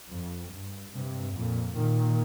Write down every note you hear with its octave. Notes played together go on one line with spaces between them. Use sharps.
F2
G2
G2 C3
F2 A#2
A#2 D#3